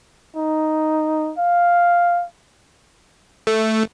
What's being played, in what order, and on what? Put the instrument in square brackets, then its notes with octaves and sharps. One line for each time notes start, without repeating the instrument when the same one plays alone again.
[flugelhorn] D#4
F5
[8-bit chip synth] A3